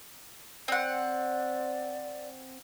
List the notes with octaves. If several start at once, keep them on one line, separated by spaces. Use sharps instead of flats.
C4 D5 F#5